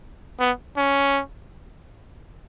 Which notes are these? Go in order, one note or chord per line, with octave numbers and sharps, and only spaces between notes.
B3
C#4